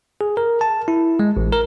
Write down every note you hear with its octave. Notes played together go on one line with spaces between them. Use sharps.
G#4
A#4
A5
E4
G#3
A1
A#4